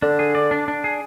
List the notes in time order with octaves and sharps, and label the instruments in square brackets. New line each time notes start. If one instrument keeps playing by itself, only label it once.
[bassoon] D3 [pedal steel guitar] D4
[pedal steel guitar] G#4
D5
D4
D4
G#4